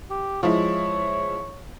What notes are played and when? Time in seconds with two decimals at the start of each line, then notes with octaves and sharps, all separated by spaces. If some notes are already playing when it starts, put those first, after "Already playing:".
0.10 G4
0.43 F3 G#3 E4 C#5